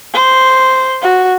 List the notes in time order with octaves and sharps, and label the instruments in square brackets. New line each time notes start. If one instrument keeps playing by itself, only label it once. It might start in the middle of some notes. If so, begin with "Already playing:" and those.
[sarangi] C5
F#4